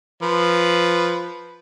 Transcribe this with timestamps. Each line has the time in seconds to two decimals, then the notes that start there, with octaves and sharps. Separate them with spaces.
0.23 F3 B4